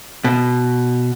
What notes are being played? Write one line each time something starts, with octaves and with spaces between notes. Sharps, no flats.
B2